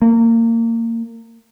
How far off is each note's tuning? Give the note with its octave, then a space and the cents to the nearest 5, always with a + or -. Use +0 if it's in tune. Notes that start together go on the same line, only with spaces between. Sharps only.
A#3 -25